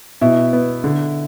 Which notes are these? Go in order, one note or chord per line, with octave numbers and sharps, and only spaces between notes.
B2 E4
B3
D3